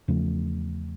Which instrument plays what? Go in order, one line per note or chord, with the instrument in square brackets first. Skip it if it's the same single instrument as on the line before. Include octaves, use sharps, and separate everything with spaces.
[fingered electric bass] E2 C#3 F3 A3